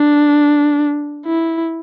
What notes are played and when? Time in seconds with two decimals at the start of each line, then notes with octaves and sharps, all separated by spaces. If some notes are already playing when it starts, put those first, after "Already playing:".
Already playing: D4
1.26 E4